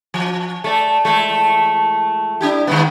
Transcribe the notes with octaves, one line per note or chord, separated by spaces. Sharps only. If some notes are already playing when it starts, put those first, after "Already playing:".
F3
A3 D5
E3 G#3 A3
D4 E4 G4
D#3 G#3 B3